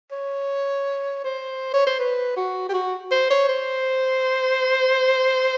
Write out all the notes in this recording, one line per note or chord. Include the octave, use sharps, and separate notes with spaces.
C#5
C5
C#5
C5
B4
F#4
G4
F#4
C5
C#5
C5